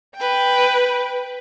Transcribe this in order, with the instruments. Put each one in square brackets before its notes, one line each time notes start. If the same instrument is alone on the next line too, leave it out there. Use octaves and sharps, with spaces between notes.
[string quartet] B4 G5